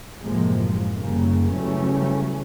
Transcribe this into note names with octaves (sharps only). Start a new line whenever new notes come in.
F#1 A2 C3 F3 G#3 A#3
F#1 C#3 G3 A#3
C#3 E3 F#3 G3 A3 C#4